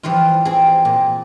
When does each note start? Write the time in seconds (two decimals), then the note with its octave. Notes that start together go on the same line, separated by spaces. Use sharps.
0.03 E3 F3 G3 E4 F4
0.45 C4 G#4
0.85 A#2